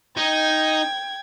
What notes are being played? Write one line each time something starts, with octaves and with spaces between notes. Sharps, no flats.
D#4 G5 G#6